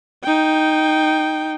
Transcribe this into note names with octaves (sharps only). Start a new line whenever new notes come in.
D#4 G5